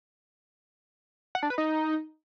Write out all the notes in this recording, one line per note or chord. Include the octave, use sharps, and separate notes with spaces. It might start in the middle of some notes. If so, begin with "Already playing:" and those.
F#5
D4
B4
D#4